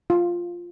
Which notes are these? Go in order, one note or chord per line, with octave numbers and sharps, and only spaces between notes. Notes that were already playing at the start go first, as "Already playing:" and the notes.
F4